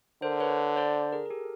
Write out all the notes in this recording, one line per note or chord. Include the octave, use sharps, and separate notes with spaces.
D3 A#4 C5
B4 C#5
C5 D5
G#4 A#4
A#4
G4 A4